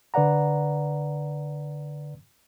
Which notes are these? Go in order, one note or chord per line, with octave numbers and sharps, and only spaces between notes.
D3 B4 D5 F#5 A#5